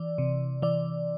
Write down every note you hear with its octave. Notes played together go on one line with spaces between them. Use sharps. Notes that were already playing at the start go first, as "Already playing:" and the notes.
Already playing: E3 D5
C3
E3 D5